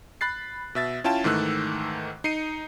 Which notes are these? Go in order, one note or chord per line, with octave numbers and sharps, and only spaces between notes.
B5 F#6 A6 C7
B2 E5 A6
C#4 E4 F4 G5 A5
G#2 D#3 E3 A3 E6 F#6
D#4 C7 C#7 D#7